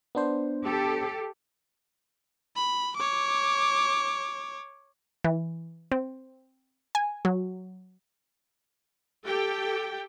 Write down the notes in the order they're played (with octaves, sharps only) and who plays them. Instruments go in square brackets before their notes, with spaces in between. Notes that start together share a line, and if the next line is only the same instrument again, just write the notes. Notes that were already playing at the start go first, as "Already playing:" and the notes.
[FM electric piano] B3 D4 C5
[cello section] G4 A4
[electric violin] B5
C#5 D6
[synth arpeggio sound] E3
C4
G#5
F#3
[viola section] G4 A4 G5